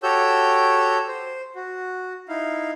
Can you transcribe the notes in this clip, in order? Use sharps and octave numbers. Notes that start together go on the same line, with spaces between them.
F#4 G4 A4 C#5 E6 G6
C5
F#4
D#4 E4 F5